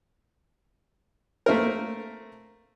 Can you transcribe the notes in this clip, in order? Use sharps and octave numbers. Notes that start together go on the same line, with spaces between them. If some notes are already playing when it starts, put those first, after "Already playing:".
A3 A#3 C4 A#4